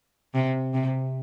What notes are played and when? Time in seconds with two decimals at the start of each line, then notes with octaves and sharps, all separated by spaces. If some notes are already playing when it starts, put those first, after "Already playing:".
0.35 C3
0.74 C3